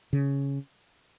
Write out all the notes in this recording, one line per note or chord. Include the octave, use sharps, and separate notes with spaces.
C#3